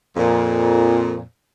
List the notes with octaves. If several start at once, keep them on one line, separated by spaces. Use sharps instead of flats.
F2 A#2